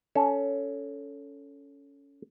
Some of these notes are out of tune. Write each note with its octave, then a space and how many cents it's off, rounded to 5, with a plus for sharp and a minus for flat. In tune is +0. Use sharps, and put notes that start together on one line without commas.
C#4 +15 A4 +0